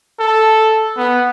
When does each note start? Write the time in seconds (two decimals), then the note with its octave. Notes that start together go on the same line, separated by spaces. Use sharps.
0.20 A4
0.97 B3